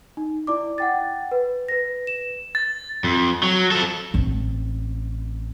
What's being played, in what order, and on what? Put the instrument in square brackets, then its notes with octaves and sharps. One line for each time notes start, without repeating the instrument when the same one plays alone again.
[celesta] D#4
E4 D5 D6
F#5 G5 A6
B4
B4 A#6
E7
[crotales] A6
[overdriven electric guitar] F2
F#3
F3 A4
[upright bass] A1 C4